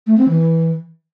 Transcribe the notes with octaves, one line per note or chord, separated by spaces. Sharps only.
A3
C4
E3